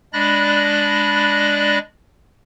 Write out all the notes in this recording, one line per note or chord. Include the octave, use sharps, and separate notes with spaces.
G#3 D4 D5 B5 F#6 A#6